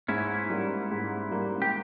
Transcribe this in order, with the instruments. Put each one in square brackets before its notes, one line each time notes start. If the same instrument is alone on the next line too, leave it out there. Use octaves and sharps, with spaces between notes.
[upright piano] G#2 [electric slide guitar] C#4 E4
[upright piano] G3 A#3
G#2
G3 A#3
[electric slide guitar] G4